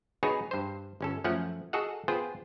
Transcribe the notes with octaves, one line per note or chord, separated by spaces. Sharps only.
B3 D#4 F#4 G#4 B4 C#5
G2 C5
G1 C#4 A4
F#2 F3 A3 C#4 F#5
F#4 G#4 A4 D#5 F#5
B3 F4 G#4 C5 G5